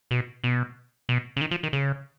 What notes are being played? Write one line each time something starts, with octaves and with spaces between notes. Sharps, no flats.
B2
B2
B2
C#3
D#3
F3
D#3
C#3